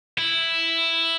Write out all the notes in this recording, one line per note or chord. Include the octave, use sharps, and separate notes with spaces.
E4